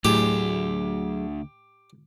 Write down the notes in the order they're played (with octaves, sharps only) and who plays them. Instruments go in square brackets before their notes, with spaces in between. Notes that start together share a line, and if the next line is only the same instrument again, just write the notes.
[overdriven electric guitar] D2 [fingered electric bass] A2 [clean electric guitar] F#3 G#4 [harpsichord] G4